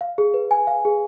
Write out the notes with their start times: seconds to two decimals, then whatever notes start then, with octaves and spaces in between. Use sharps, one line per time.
0.01 F5
0.18 G#4
0.34 B4
0.51 G#5
0.67 F5
0.85 G#4